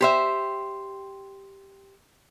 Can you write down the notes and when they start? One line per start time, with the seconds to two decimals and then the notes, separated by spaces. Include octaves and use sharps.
0.01 G4 C5 E5